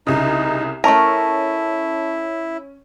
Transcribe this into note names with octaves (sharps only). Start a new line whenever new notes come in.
C2 C#3 D#4
A3 C#4 E4 A#4 A5 C#6